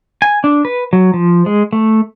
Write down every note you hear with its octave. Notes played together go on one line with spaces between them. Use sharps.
G#5
D4
B4
F#3
F3
G#3
A3